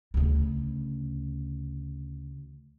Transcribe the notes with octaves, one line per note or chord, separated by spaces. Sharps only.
D2 C#3